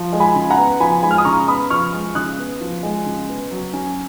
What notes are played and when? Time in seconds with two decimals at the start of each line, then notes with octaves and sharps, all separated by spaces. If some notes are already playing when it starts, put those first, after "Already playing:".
Already playing: F3
0.13 G#3
0.20 G#5 B5
0.35 C#3
0.50 F#5 A#5
0.58 B3
0.80 F3 G#5 B5
1.03 G#3 G#5 B5
1.11 F6
1.18 D#6
1.25 C#3 A#5 C#6
1.48 B3 B5 D#6
1.70 F3 C#6 F6
1.93 G#3
2.15 C#3 D#6 F#6
2.38 B3
2.61 F3
2.83 G#3
3.06 C#3
3.28 B3
3.51 F#3
3.73 C#4